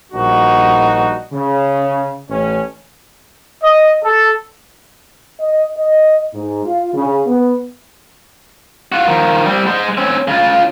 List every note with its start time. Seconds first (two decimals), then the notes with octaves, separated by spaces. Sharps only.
0.12 A#1 G2 D#4 F#4
1.33 C#3
2.30 A1 A2 C#4
3.63 D#5
4.04 A4
5.40 D#5
5.77 D#5
6.33 G#2
6.65 F4
6.94 C#3
7.27 B3
8.92 F4 F#4
9.08 D#3 F3
9.46 G3 C4
9.67 G#3 C5
9.98 C4 C#4
10.28 C#3 F4